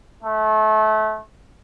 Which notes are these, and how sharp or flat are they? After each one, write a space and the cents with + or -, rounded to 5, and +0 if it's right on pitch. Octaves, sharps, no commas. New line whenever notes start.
A3 -25